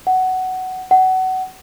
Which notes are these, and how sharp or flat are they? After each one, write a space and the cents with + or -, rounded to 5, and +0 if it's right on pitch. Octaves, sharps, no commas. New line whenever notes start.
F#5 +10
F#5 +20